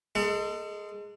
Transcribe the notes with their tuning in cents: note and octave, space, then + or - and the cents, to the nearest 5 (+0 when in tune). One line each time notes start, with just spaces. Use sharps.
G#3 +0 A4 +35